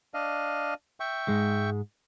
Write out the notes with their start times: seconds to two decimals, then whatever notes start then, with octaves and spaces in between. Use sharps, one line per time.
0.14 D4 D#5 F5
1.00 E5 G5 C#6
1.28 G#2 G#3